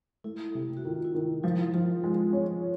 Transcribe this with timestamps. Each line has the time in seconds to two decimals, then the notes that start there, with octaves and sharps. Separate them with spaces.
0.24 A3 E4
0.55 C3
0.77 F#4
0.84 D#3 F4
1.04 E4
1.15 D#3
1.43 F3 E4
1.74 F3 F4
2.04 G#3
2.33 C#4